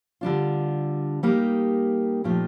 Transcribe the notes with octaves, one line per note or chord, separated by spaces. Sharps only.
D3 G3 D4 F4
G3 A#3 D#4 G4
A#2 F3 A3 D#4 G4